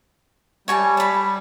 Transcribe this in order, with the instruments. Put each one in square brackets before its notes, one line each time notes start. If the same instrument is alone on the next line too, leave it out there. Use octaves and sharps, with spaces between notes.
[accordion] G3 [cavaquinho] C#5 G#5 A5
[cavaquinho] A5 B5